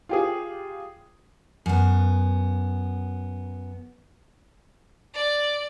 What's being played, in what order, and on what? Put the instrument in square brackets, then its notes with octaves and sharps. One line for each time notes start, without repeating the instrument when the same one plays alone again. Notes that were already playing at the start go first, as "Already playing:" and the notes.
[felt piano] F4 G4 G#4
[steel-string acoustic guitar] F#2 B3
[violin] D5